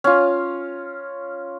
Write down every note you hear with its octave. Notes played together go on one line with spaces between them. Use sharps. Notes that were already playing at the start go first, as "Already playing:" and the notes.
C#4 F4